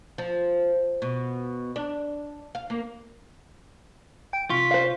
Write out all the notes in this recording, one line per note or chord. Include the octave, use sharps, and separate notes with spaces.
F3
B2
D4
F5
A#3
G5 D7
C3 F4 C#6 B6
C5 F5